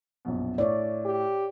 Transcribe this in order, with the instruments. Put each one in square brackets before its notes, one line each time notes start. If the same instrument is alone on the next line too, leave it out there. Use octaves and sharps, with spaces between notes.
[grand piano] A#1 F#2 B2
[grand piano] A2 [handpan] C#5 D5
[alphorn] G4